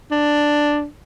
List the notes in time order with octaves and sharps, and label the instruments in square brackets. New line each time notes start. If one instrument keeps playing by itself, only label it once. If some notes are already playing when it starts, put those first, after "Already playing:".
[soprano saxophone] D4